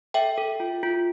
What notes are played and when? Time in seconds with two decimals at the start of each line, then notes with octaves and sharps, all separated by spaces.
0.14 A4 E5 G5
0.38 A4
0.60 F4
0.83 F4